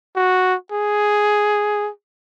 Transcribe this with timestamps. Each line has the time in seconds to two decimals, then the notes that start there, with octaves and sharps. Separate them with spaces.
0.16 F#4
0.72 G#4